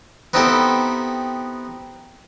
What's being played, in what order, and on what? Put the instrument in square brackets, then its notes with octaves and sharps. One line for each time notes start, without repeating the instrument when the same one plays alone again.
[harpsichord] B3 C4 D#4 E4 G4 A4